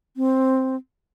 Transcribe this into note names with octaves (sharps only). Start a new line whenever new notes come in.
C4